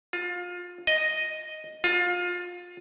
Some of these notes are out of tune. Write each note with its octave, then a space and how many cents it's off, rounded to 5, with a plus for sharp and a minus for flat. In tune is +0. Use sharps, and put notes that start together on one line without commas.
F4 +25
D#5 +0
F4 +25